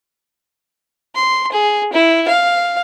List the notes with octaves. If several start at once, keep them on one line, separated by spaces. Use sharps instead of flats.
C6
G#4
E4
F5